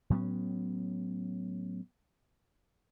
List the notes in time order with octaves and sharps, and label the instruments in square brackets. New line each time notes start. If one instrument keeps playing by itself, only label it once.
[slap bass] A2 F#3 B3 C#4